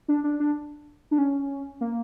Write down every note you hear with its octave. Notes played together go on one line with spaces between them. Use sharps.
D4
D4
D4
D4
C#4
A#3